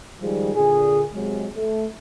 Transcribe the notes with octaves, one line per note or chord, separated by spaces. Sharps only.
D#3 F3 G3 G#3
A#2 D3 G#4
C3 F#3 G#3
A3